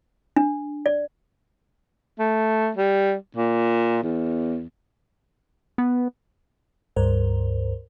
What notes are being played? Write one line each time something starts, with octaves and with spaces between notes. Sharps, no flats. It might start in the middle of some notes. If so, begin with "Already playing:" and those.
D4
D5
A3
G3
A#2
E2
B3
C#2 G2 A#4 C5